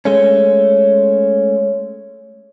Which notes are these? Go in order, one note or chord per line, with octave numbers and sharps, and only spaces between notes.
G#3 A3 C#4 C#5